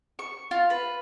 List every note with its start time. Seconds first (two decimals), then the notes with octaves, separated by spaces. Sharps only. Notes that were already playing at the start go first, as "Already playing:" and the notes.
0.19 C#6
0.51 F4
0.70 B4